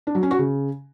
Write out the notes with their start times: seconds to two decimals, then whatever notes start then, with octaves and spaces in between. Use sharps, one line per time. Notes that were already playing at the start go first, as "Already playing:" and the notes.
0.07 D4
0.15 F#3
0.23 C#4
0.31 F#4
0.39 C#3